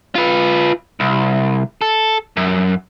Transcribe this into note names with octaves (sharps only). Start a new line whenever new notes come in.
F4 B4
C2
A4
F#2